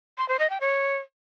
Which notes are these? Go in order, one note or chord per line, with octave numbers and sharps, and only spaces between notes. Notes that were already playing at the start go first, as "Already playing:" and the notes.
C6
C5
D#5
G5
C#5